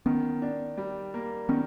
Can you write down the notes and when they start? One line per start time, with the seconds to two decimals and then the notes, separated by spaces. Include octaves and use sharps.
0.06 D#3 B3 C#4
0.42 D4
0.78 G3
1.14 A#3
1.49 D#3 B3 C#4